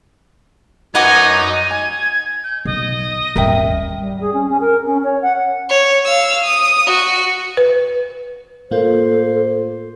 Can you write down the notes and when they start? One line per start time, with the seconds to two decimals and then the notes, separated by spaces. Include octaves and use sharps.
0.95 F#2 D#4 B4 D#5 F#5 G#5 D6
1.56 D#7
1.71 G#5 G#6
2.44 G6
2.65 B1 D#5
3.36 D#1 G#1 A#4 E5 G5
4.00 G3
4.21 G#4
4.33 C#4
4.49 C#4
4.61 A#4
4.86 C#4
5.03 C#5
5.22 F#5
5.69 C#5
6.05 F5 E6
6.44 D#6
6.87 F#4
7.57 B4
8.71 A2 A#3 F4 A4 C5